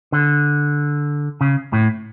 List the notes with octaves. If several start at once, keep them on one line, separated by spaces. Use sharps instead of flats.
D3
C#3
A2